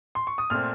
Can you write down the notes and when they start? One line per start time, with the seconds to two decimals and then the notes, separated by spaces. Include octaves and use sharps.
0.15 C6
0.27 C#6
0.38 D#6
0.50 A#2 A3 C4 F6